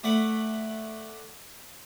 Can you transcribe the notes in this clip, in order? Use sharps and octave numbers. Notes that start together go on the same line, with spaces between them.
A3 D5 F#5 B5